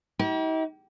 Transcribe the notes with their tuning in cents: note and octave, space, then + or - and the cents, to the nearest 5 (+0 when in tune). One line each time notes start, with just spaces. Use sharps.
D#4 +45 G4 -35